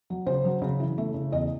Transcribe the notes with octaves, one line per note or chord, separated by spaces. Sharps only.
F#3
C#3 C5
F#3
C#3
E3
A3
C#3
E2 D#5